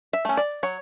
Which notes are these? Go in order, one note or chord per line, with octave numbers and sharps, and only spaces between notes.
E5
A3 C#4
D5
F#3 C#5